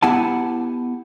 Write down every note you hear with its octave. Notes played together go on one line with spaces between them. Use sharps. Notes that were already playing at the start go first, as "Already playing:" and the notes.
B3 E4 G4 F#5 G#5 A5